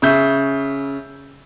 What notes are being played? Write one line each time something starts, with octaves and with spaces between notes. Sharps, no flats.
C#3 E5 G6